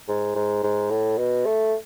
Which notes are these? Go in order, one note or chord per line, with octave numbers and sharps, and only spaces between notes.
G#2
G#2
G#2
A2
B2
A3